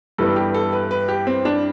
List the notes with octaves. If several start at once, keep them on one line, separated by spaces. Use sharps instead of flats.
G2 E3 G3 B3 A4
G4
A4
B4
B4
G4
C4
D4